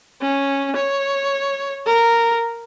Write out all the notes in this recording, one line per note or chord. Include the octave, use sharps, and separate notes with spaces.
C#4
C#5
A#4